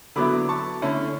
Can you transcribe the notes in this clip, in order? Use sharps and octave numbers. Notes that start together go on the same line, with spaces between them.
D3 F#3 B3 E4 B5 D6
A5 C#6
D3 A3 C#4 E4